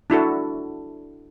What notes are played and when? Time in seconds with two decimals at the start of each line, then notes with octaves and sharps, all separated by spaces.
0.10 D4 E4 F#4 A4